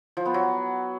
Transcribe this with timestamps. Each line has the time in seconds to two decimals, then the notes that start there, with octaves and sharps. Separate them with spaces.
0.17 F3
0.26 B3
0.34 F#3